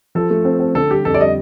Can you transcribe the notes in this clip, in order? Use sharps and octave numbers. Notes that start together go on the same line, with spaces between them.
F3 A4
A3
C4
C4
D3 A4
G3 G4
F2 A4
D5
G3 D#5